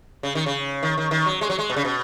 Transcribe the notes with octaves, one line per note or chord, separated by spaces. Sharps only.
C#3
D#3
C#3
D#3
D#3
D#3
F#3
G#3
F#3
G#3
B2
C#3
B2